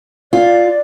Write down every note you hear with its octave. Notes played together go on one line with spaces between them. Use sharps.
F4 D5